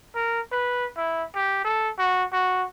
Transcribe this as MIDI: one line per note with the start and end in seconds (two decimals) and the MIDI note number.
0.15 0.40 70
0.52 0.85 71
0.96 1.24 64
1.35 1.61 67
1.65 1.90 69
1.99 2.24 66
2.33 2.65 66